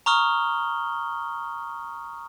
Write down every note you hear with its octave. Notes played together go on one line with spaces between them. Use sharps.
A#5 C#6 D#6 F6 G7